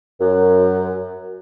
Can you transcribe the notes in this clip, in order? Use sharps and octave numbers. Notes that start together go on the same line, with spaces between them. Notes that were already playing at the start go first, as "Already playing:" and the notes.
F#2